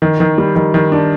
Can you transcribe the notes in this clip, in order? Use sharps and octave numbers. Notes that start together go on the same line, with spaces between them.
D#3
D#3
G3
D#3
D#3
D4